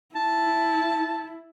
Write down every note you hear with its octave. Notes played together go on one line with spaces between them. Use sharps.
E4 A5